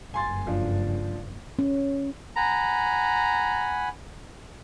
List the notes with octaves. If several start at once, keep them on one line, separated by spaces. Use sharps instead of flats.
F#1 G2 G#5 C6 A6
F3 D4
C#4
F#5 G#5 A#5 B5